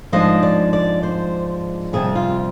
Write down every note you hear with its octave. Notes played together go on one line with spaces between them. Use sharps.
G#2 F3 G#3 D4 D#5
D5
D5
C5
F2 C3 G3 G#4
F4